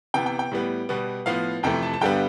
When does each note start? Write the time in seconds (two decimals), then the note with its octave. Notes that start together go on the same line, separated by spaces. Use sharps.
0.14 C3 E3 B3 G5
0.26 G5
0.39 G5
0.51 A2 G3 B3
0.89 B2 G3 B3
1.26 A2 F3 B3 F5
1.63 F2 C3 E3 A3 G5
1.83 A5
1.93 A5
2.01 G2 D3 G3 B3 G5